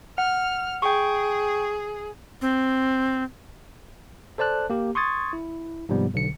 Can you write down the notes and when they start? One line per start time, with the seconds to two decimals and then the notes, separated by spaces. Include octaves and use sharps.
0.18 F#5 F6
0.82 G#4 G5 C#6
2.41 C4
4.38 A4 C5 D5 A5 F#6
4.70 A#3 G4
4.95 C6 C#6 D#6 G#6 A6
5.33 E4
5.89 G#2 C3 F3 G3 B3
6.14 B1 D3 C#7